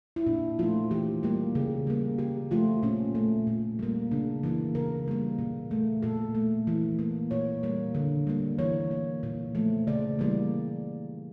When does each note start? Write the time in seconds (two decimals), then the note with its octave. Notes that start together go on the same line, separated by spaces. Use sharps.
0.16 E4
0.27 A#2 D4
0.59 F3 A3 F4
0.91 E3 G4
1.23 G3 A#3 G4
1.55 C#3
1.87 G3 A#3
2.19 C#3 G4
2.51 F3 A3 F4
2.83 A#2 C#4
3.15 A3
3.47 A#2
3.79 G3 A#3
4.11 C#3 D4
4.43 E3 A#3
4.75 C#3 A#4
5.08 G3 A#3
5.39 A#2
5.71 A3
6.03 A#2 A4
6.35 A3
6.67 E3
6.99 A#3
7.31 A#2 C#5
7.63 G3 A#3
7.95 D3
8.27 G3 A#3
8.59 E3 C#5
8.91 A#3
9.23 A#2
9.55 F3 A3
9.87 C#3 D5
10.19 E3 G3 A#3